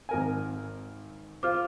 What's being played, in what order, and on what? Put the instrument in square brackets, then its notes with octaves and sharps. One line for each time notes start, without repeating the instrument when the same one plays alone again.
[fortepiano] G#1 A#4 G#5
[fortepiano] F4 C5 [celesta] D6 F6